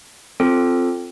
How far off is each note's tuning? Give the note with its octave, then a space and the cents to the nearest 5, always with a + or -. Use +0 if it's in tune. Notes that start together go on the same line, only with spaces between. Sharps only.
C4 +0 F4 +0 A4 -5